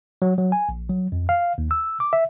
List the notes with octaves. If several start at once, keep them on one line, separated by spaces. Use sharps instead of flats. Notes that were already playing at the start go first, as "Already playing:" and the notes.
F#3
F#3
G#5
A#1
F#3
F2
F5
D#2
E6
D6
E5